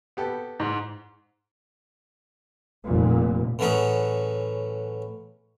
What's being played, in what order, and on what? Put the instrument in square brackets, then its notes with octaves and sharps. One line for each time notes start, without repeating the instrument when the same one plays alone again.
[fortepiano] B3 G4 A4
[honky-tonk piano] G#2
[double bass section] F1 A#2
[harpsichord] A2 E3 F#3 C#4 G#4